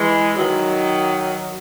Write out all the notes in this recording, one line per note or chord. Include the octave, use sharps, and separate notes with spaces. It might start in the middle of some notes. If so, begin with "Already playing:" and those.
Already playing: E3 G#3
D#3 F#3